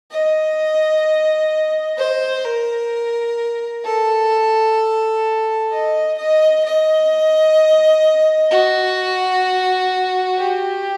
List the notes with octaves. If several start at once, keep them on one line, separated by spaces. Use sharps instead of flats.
D#5
C5
A#4
A4
D#5
D#5
D#5
F#4
G4